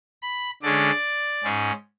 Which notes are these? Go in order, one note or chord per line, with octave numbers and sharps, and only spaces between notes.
B5
D3 G#3 C#4 D5
G#2 G#3 C#4